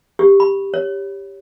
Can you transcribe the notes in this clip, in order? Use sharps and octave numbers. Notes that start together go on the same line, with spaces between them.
G4
B5
C#5